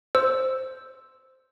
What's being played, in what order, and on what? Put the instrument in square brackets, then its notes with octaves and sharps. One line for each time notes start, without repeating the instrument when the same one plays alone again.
[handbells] C5 E6